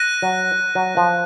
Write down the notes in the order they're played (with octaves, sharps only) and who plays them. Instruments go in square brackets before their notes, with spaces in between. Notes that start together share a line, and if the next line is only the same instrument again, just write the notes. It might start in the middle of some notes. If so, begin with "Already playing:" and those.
Already playing: [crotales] F#6 A#6 D#7
[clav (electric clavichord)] F#3
F#3
F3